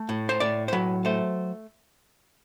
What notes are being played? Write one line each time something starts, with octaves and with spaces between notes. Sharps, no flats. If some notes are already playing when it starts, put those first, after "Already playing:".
Already playing: A3
A2
C5
A2 D5
C5
F#3 B4
A3 C5